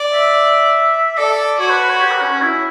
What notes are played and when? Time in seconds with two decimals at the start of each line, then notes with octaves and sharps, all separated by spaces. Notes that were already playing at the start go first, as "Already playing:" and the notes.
Already playing: D5
0.13 E5
1.17 A4 D5
1.59 F#4 C#5
1.70 B4
1.80 B4
1.90 C#5
2.01 G4
2.11 B4
2.22 C#4
2.32 C#4
2.42 E4